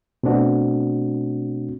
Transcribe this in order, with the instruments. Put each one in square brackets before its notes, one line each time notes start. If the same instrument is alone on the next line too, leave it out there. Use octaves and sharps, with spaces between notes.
[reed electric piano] B2 A3 C4 D4 F#4